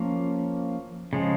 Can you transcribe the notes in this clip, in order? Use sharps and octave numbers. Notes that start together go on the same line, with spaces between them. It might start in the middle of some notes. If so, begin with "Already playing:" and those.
Already playing: F3 A#3 C#4
C#3 F3 G#3